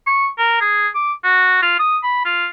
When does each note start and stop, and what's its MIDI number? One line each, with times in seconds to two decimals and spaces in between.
0.07 0.29 85
0.38 0.56 70
0.61 0.88 68
0.94 1.13 86
1.24 1.57 66
1.62 1.77 65
1.79 1.98 87
2.03 2.20 83
2.25 2.47 65